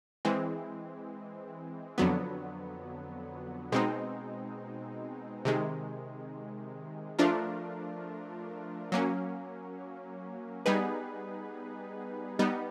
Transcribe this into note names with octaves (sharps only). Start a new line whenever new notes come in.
E3 G#3 C4
F2 D3 F#3 B3
B2 G#3 C4 D#4
C3 D#3 G#3
F3 A3 D4 F4 A#4
F#3 A#3 C#4
G3 B3 D#4 G#4 B4
G3 B3 D#4